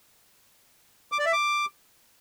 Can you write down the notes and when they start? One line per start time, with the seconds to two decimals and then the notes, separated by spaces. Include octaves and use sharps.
1.12 D6
1.19 D5
1.26 E5
1.33 D6